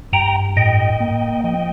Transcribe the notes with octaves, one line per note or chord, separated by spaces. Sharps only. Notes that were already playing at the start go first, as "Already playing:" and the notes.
G2 G5 A#5
A2 D#5 G5
A#3
F3 D#5 G5